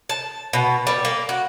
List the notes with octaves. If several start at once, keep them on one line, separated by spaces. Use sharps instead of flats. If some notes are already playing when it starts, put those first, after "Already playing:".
A5
B2
G3
A#3
F#4